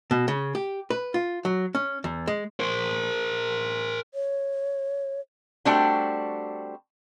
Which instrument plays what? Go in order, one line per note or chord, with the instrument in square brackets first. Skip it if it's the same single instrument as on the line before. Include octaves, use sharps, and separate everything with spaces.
[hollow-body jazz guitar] B2
C#3
G4
B4
F4
F#3
C#4
E2
G#3
[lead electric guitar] A#4 C5
[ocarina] C#5
[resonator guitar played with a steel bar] G3 A3 C4 D4 F#4 G5